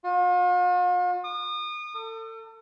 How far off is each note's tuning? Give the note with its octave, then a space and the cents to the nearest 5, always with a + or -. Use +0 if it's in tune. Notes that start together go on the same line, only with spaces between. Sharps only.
F4 +45
D#6 -35
A4 +35